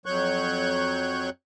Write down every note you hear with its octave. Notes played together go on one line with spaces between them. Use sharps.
F2 F#3 C#5 C#6 F#6 G6